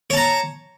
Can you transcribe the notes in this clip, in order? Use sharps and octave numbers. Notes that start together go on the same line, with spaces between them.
C#5 A5 A#5